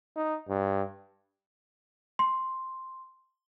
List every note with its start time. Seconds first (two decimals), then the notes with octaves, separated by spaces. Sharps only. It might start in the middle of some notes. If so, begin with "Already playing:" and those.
0.16 D#4
0.49 G2
2.19 C6